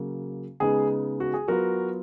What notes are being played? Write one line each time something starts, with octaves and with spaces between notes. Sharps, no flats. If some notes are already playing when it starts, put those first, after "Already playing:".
Already playing: C#3 F#3 A#3
C#3 G#3 B3 D#4 G#4
F#4
G#4
F#3 B3 F4 F#4 A#4